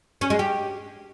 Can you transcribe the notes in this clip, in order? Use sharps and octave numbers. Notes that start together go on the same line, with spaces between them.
C#4
G#3
G4